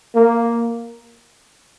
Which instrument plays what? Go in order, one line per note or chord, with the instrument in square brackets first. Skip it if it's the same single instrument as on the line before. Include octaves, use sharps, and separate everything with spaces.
[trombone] A#3